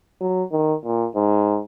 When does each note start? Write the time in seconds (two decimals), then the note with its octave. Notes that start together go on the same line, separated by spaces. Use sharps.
0.21 F#3
0.52 D#3
0.84 A#2
1.15 G#2